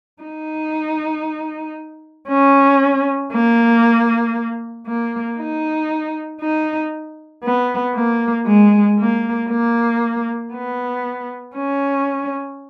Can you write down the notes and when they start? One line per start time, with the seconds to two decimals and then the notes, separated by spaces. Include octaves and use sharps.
0.22 D#4
2.28 C#4
3.32 A#3
4.86 A#3
5.38 D#4
6.41 D#4
7.44 B3
7.96 A#3
8.46 G#3
8.99 A#3
9.50 A#3
10.53 B3
11.56 C#4